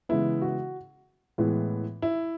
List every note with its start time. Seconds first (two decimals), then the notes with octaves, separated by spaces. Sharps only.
0.09 C#3 E3 G#3 B3 E4
0.42 F#4
1.38 A2 E3 G#3 B3
2.02 E4